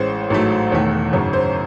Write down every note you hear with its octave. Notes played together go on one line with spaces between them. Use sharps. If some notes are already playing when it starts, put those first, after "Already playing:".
Already playing: A1 A2 G#3 C#4 C5
A1 G#2 F#3 A3
E1 E2 D#3 A3 C#5
G#1 F#2 C#3 C#5
C5